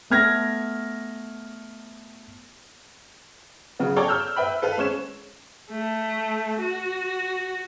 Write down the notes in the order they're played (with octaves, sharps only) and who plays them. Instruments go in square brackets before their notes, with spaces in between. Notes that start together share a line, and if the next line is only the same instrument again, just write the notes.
[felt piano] A3 B3 F6 G#6 A#6
[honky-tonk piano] C#3 F#3 B3
G#4 A4 C#5 D5 G5 A#5
E6 F6 G6
B4 E5 G5 B5
A4 B4 F5
G#3 C4 C#4 C#5 E7
[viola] A3
F#4